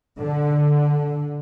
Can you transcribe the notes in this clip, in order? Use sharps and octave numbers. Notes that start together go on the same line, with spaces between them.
D3